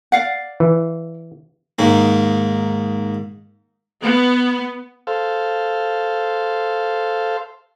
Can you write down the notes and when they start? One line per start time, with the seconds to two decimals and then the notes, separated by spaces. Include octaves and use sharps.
0.12 D5 F5 F#5
0.60 E3
1.79 G#2 D#3 A#3
4.02 B3
5.07 A4 C5 F5